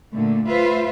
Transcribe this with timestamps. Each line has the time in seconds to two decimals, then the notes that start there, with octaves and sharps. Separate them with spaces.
0.14 A#2 D3 A3
0.48 A3 F4 B4 C5 E5